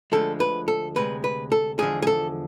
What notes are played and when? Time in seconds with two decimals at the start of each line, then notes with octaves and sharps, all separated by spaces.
0.12 D2 D3 F3 G#3 A4
0.40 B4
0.68 A4
0.96 D2 C3 G#3 B4
1.24 B4
1.52 A4
1.79 E2 D3 F3 G#3 G#4
2.02 G#4
2.07 A4